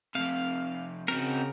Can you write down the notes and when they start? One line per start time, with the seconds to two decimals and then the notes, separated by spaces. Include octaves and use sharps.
0.15 F2 C3 F5
1.08 C#3 C4 F#4 A#4